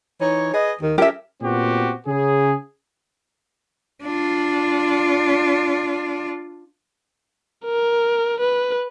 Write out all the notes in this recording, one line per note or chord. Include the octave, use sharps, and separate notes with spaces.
E3 D#4 C#5
G#4 B4 D#5
D#2 D#3
C#4 G4 A4 A#4 E5
A#2 B3 C4 F#4 G4
C#3 G#4
D4 F4
A#4
B4